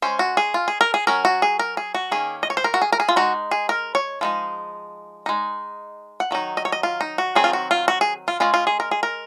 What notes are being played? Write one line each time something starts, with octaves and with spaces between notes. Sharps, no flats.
G#3 C#4 C5
F#4
G#4
F4
G#4
A#4
G#4
F#3 C#4 A#4
F#4
G#4
A#4
G#4
F#4
D#3 A#3 C#4 G#4
D#5
C#5
C5
A#4
F#4
G#4
A#4
G#4
F4
G#3 D#4 F#4
G#4
A#4
C#5
F3 G#3 D#4
G#3 D#4
F#5
D#3 F#3 D#4
D#5
C#5
D#5
F4
D#4
F#4
D#3 F#3 C4 D#4 G#4
F4
F#4
F4
F#4
G#4
F4
G#3 C#4 F4
F4
G#4
A#4
G#4
A#4